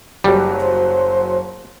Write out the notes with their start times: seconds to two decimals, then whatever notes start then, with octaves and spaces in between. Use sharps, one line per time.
0.24 F#1 F#3 G3 G4
0.60 C5